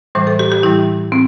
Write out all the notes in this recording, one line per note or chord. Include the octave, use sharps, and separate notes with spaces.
A2 E3 G3 C5
A4
G4
G4
A2 E3 G3 E4
A2 C4